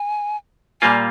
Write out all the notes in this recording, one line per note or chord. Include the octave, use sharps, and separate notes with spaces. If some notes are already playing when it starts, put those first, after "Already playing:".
Already playing: G#5
A#2 G3 A#3 F4 G#5